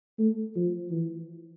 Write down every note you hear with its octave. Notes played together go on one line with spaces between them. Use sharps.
A3
F3
E3